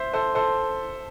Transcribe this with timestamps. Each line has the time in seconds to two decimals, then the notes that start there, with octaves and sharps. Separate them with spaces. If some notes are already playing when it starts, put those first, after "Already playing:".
Already playing: C5 E5
0.13 A4 C5
0.35 A4 C5